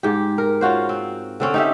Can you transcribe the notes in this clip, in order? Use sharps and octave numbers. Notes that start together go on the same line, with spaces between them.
G#2 G4
A#4
C#4 F4 F#4 C5
C4
D3 C4 C#4
D#4 G4 E5